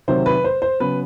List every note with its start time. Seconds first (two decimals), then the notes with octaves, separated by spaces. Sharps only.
0.08 C3 D#3 F#3 C5
0.26 B4
0.44 C5
0.62 C5
0.80 C#3 F#3 B3 B4